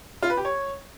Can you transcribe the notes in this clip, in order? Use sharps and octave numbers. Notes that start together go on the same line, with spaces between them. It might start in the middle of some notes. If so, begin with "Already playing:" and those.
F4
B4
G4
C#5